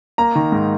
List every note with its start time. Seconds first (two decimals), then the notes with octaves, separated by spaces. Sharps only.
0.18 A#3 A#5
0.35 D#3
0.52 G#2